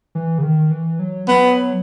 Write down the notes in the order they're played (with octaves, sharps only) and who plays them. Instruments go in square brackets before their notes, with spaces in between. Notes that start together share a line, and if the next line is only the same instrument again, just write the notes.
[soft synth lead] E3
C#3
D#3
E3
F#3
[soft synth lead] F#3 [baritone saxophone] B3